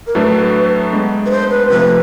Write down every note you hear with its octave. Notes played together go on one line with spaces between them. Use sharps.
A#4
A2 F#3 A3 D4 B4
G#3 B3 D4
B4
C5
B4
C3 F3 A3 B4